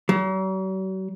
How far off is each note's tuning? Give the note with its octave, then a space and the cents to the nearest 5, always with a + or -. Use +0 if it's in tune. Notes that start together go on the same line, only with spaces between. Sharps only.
F#3 +45